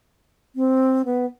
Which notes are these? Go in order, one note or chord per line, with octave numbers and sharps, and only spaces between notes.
C4
B3